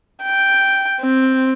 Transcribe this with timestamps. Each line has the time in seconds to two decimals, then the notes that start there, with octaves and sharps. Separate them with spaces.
0.23 G5
1.01 C4